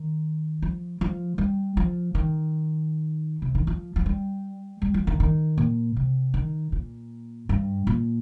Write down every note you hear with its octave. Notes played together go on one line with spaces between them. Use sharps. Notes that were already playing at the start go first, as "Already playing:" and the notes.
Already playing: D#3
F3
F3
G3
F3
D#3
C3
D#3
F3
F3
G3
G3
F3
D#3
D#3
A#2
C3
D#3
A#2
G2
A#2